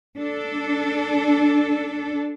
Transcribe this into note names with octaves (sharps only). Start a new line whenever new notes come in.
D4 A4